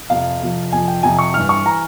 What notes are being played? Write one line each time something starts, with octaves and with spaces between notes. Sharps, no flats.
F2 C3 F3 F5
F2 C3 F3
F2 C3 F3 G#5
G5
F2 C3 F3 G#5
C#6
G2 E3 F6
C#6
E3 A#5